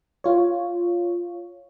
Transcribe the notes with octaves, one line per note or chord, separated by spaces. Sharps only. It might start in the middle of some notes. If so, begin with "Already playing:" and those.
F4 C#5